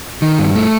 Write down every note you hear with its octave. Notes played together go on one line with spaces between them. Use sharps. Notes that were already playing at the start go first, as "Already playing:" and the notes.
D#3
G2
A3